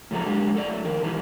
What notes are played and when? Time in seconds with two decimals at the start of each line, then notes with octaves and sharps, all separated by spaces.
0.11 A2 C#3 F3 F#3 A4 A#5
0.26 F#2 D3 G#3 D4 G4
0.54 F#2 A4 D5
0.69 F#3 A3
0.84 F2 D#3 A#4
1.03 B2 D#3 E3 G3 B3